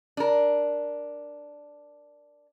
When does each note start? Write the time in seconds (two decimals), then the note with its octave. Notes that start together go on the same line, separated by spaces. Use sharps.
0.17 D4 A#4